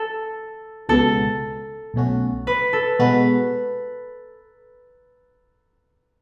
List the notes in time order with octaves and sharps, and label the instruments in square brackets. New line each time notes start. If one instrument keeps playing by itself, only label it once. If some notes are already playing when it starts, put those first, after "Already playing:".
Already playing: [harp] A4
[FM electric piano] C#2 B2 G#3 B3 [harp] A4
[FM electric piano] B1 B2 A3 C#4 F#4
[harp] B4
A4
[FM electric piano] B2 G#3 B3 F#4 [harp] B4